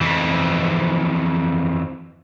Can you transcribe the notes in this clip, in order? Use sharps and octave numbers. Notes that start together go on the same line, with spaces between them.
F2 E3